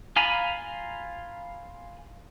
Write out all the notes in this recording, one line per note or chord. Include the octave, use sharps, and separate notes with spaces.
F4 F5 G#5 A#5 B5